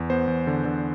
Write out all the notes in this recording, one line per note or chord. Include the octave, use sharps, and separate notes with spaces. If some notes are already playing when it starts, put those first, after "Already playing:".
Already playing: E2
B3 C5
E2
D3
D3